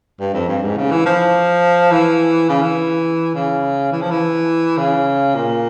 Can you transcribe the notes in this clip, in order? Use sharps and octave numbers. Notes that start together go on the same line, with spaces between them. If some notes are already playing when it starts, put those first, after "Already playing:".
G2
F2
G2
G#2
C#3
E3
F3
E3
C#3
E3
C#3
E3
F3
E3
C#3
A#2